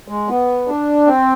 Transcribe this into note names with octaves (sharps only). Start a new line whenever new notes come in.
G#3
B3
D4
C4